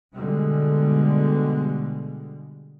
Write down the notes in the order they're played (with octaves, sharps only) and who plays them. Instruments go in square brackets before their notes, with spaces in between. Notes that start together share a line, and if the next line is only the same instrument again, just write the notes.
[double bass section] B2 D3 G3 G#3